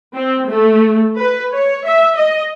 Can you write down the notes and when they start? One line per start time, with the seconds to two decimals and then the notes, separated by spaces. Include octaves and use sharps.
0.15 C4
0.48 A3
1.18 B4
1.53 C#5
1.85 E5
2.17 D#5